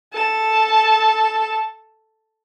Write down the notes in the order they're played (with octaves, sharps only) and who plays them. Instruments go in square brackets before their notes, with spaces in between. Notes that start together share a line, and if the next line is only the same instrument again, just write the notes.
[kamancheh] A4 A5